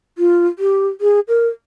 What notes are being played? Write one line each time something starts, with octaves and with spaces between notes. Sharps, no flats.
F4
G4
G#4
A#4